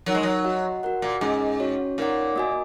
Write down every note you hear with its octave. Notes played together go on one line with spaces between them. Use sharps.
F#3 D#4 A#4 F#5
G#3
F#3
F#4 D#5 F#5
F#4 A#4 F#5
A#2
G#2 C#4 G#4 D#5 G#5
C#4 F#4 C#5
A#2 D#4 A#4 C#5 F#5
A#3 F#4 D#5 G#5